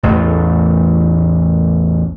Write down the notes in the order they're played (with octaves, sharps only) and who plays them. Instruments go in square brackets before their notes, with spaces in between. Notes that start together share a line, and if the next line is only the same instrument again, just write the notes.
[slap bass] A1 E2 A3